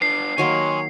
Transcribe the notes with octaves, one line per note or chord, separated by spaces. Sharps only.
B3 D4 C7
D#3 F#3 A#3 C#5 G#5 C6